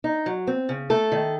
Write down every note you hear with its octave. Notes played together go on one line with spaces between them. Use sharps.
D#4
F#3
C4
C#3
A3 A4
D#3